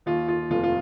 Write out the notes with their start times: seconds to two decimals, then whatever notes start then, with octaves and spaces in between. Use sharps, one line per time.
0.06 D#2 F4
0.28 F4
0.51 F1 F4
0.64 F4